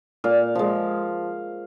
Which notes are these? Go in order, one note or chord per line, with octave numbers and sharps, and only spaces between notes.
A#2 F5
F3 G#3